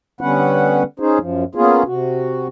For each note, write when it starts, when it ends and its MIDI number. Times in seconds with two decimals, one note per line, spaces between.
0.21 0.83 50
0.21 0.83 55
0.21 0.83 59
0.21 0.83 61
0.21 0.83 71
0.21 0.83 78
1.00 1.18 61
1.00 1.18 63
1.00 1.18 68
1.00 1.18 72
1.19 1.44 42
1.19 1.44 53
1.55 1.83 58
1.55 1.83 59
1.55 1.83 61
1.55 1.83 65
1.55 1.83 68
1.86 2.48 48
1.86 2.48 66